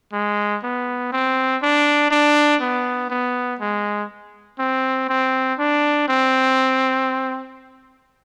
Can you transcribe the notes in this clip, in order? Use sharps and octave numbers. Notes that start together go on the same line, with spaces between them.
G#3
B3
C4
D4
D4
B3
B3
G#3
C4
C4
D4
C4